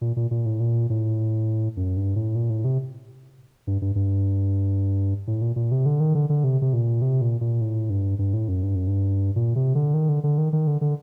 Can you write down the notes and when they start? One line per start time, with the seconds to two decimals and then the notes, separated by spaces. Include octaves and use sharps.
0.01 A#2
0.16 A#2
0.31 A#2
0.46 A2
0.60 A#2
0.90 A2
1.77 F#2
1.97 G2
2.16 A2
2.35 A#2
2.50 A2
2.65 C3
3.67 G2
3.82 G2
3.95 G2
5.27 A2
5.41 A#2
5.56 A#2
5.72 C3
5.86 D3
6.00 D#3
6.15 D3
6.29 D3
6.44 C3
6.62 C3
6.73 A#2
7.02 C3
7.21 A#2
7.41 A#2
7.61 A2
7.90 G2
8.19 G2
8.34 A2
8.48 F#2
8.63 G2
8.75 F#2
8.87 G2
9.36 A#2
9.56 C3
9.75 D3
9.94 D#3
10.09 D3
10.24 D3
10.38 D#3
10.53 D#3
10.67 D3
10.81 D3